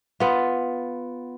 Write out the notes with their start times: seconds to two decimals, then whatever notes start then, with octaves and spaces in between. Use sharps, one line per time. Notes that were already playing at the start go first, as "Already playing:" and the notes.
0.20 B3 F4